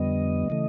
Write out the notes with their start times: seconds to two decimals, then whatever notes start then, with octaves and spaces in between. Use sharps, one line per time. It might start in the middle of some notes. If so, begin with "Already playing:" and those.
Already playing: F2 D3 G3 B3 D#5
0.50 C#3 E3 A3